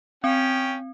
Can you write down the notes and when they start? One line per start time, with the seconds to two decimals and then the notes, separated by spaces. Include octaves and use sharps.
0.24 C4 C#4 G5